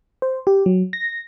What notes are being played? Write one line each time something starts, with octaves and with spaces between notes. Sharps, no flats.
C5
G4
F#3
A#6